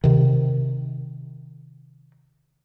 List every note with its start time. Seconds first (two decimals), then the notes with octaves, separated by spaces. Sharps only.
0.04 C3 D#3